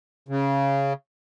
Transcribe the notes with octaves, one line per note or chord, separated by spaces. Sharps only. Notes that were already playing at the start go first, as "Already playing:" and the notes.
C#3